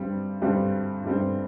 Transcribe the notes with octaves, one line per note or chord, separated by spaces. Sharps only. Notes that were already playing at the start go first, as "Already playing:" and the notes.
Already playing: G2 G3 C4
G2 G3 C4
G2 G3 C4